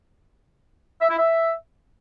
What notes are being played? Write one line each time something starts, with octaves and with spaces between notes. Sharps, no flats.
E5
E4
E5